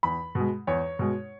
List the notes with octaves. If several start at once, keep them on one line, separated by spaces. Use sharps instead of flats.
E2 B5
B2 G#3
E2 C#5
B2 G#3